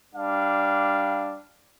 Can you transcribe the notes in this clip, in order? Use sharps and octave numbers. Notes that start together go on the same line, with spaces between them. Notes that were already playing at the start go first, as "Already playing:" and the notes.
G3 D4 F5